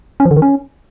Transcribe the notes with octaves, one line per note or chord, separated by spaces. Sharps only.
C#4
F3
D3
D#3
C#4